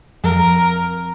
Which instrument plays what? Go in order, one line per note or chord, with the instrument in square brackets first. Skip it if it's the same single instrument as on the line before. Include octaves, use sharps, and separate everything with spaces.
[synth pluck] F2 [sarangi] A#4